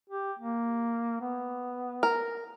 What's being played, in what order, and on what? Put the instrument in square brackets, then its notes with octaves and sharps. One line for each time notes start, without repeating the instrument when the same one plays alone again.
[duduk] G4
A#3
B3
[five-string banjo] A#4